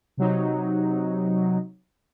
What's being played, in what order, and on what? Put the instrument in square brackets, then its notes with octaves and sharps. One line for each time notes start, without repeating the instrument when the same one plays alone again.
[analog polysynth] C3 F#3 D#4